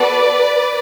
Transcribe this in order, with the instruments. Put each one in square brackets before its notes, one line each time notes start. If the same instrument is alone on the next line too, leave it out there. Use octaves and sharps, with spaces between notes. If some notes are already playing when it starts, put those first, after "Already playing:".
Already playing: [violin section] B3 F#4 A4 B4 D5